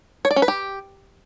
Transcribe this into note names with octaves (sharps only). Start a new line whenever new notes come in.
C#5
D5
C#4
B4
G4